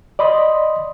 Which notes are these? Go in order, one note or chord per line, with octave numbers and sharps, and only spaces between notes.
D5 D#5 B5 C6 D#6